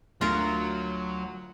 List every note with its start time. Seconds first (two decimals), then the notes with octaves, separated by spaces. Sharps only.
0.21 D2 F#3 F4 A#4